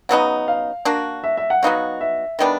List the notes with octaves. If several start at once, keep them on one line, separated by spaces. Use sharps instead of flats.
C#3 F#3 B3 D#4 F#5
F5
A#3 D4 F#4
E5
E5
F#5
F#3 B3 D#4 F#4 F5
E5
D#3 G3 B3 D4